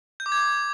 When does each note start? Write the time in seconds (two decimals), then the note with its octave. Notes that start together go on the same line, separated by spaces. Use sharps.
0.20 G6
0.26 D6
0.32 G#6